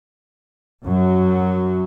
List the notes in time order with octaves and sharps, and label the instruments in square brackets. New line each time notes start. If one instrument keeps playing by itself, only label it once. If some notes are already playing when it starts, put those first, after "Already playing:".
[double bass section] F#2 F#3